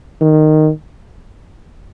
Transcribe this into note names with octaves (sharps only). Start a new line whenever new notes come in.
D#3